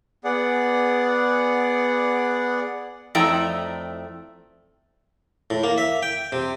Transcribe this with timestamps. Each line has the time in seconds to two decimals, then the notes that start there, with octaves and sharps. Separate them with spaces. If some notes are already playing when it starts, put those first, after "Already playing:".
0.24 B3 G#4 D5 F#5
3.15 F2 A3 E4 D5 G5 A#5
5.50 A2
5.64 A#3
5.78 E5
6.03 G5
6.32 C3